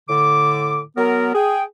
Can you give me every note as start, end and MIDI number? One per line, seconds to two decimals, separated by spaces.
0.08 0.81 45
0.08 0.81 50
0.08 0.81 86
0.97 1.31 54
0.97 1.31 59
0.97 1.31 70
1.35 1.62 68
1.35 1.62 79